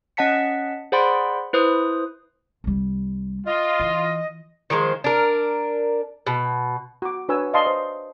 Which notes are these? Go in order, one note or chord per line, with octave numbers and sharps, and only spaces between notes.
C#4 D#5 F#5 A5 B6 C#7
G#4 C5 D5 F#5 B5 C6
E4 B4 C5 D#6
C2 G3
F4 D#5
E3
D#3 F3 G#3 C5
D4 A#4
B2
F#4 D6
D4 F#4 B4 C#5 G#5 E6
D5 D#5 F5 A5 C6
C5